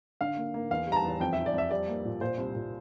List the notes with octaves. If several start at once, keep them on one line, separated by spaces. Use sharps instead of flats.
D3 F5
A#3
A#3
E2 F5
G3 A#5
A5
E2
F2 G5
F2 E5
D5
F2 E5
G3 D5
A#3
A#2
A#2 C5
C2
A#2